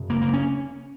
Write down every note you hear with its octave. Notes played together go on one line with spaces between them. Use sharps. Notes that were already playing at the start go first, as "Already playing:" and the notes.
Already playing: F#2 C#3
A#3
A#3
C#4